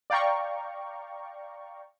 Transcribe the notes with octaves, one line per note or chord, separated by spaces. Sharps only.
D5 F5 G5 A#5 C#6